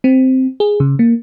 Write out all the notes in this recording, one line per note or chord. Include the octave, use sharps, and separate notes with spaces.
C4
G#4
C#3
A#3